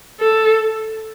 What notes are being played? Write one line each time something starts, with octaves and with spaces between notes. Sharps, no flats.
A4